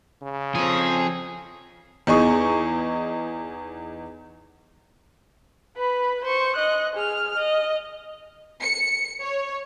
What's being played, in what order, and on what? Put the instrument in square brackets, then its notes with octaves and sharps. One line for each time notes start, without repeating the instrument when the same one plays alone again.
[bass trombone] C#3
[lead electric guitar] F3 C4 [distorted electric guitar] G#4
[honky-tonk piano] E2 D#4 G#4 C#6
[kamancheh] B4 B5
C5 C#6
D#5 F#6
G#4 F6
D#5
[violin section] C#7
C#5